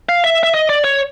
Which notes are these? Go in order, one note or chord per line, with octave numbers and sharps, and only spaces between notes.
F5
E5
E5
D#5
D5
C#5